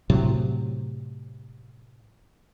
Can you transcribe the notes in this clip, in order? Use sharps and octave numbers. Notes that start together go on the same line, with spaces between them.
A2 C3 F#3